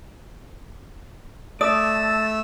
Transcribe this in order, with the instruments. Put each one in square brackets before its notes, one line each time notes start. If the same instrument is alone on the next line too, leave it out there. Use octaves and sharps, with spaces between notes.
[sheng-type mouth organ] A3 E6 [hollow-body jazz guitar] D5 [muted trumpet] A5 [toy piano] D#6